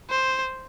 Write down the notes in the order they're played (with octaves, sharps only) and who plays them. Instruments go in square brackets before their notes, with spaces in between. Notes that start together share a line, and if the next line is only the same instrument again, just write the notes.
[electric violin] C5